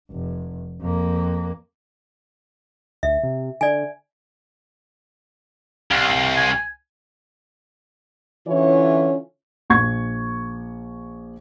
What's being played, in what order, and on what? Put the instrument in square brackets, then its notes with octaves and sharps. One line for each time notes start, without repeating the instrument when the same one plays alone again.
[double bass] F1
F2 A#3
[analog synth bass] D2 [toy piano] E5
[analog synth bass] C3
[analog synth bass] D3 [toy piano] D5 G#5
[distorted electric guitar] C2 [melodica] F5
[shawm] G#5
[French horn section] D3 E3 C#4 E4 F4 C#5
[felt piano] A#1 C#6 G#6